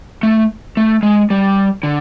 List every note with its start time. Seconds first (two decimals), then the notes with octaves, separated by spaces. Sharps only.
0.23 A3
0.77 A3
1.03 G#3
1.30 G3
1.83 D3